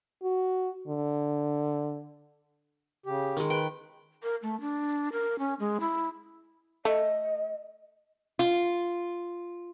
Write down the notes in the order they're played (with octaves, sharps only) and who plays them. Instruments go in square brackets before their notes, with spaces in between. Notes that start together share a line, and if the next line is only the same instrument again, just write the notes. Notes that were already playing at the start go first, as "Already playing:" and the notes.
[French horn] F#4
D3
[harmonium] C#3 G4
[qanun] D#3 G#3
[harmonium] B4 [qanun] G5
[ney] A#4
A3
D4
A#4
C#4
G#3
E4
[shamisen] A3 [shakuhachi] D#5
[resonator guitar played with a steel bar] F4